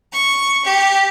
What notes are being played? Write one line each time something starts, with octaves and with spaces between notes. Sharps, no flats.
C#6
G4